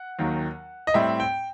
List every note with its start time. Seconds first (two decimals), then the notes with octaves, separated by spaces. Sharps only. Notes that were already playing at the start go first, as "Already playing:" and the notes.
Already playing: F#5
0.19 D#2 D#3 F#3
0.87 D#5
0.94 A2 G3 C4 E5
1.20 G5